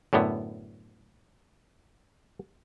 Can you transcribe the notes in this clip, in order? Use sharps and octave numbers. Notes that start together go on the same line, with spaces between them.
F#2 A2 D3 B3